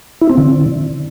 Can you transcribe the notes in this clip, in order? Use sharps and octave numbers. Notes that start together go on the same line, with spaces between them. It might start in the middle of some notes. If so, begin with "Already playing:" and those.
E4
C4
D3